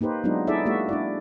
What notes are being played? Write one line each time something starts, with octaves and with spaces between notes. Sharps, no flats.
A#3 D#4 G4 B4 C5
F#3 G#3 B3 D4 D#4 F4
D#4 E4 G#4 A4 D5 E5
G#3 A#3 F#4 E5
D4 E4 D5